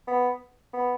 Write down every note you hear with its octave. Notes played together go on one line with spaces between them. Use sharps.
B3
B3